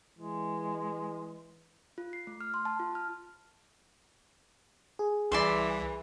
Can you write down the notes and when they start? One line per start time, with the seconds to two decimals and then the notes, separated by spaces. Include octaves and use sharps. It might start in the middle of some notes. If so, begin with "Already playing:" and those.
0.19 E3 G#3
1.98 F4
2.13 C7
2.27 A3
2.41 F6
2.54 C6
2.65 A5
2.80 F4
2.95 F6
4.99 G#4
5.32 C2 E3 D5 E5 C6